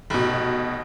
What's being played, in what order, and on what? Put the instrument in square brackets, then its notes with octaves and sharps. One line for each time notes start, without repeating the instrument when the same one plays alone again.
[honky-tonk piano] F1 B2